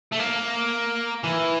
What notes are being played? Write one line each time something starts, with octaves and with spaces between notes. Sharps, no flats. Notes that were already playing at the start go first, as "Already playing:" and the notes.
A3
A#3
E3